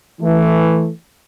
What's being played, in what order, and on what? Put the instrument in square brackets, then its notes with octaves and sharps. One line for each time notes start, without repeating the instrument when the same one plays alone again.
[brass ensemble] E3 A3